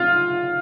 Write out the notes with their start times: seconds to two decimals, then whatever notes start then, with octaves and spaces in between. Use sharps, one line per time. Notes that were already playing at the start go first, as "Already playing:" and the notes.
Already playing: F4